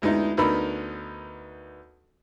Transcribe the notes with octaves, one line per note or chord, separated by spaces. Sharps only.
D2 G#3 B3 D#4 E4
D2 B3 D#4 A#4 B5 E6